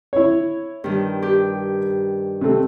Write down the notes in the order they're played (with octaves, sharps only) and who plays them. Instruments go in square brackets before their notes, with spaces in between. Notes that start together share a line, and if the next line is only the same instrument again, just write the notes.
[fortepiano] E4 C#5
[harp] G2 D#3
G4
[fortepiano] C3 A3